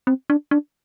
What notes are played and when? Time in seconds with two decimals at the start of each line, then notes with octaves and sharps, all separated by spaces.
0.07 C4
0.30 D4
0.51 D4